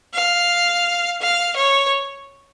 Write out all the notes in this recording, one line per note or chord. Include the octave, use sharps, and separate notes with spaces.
F5
F5
C#5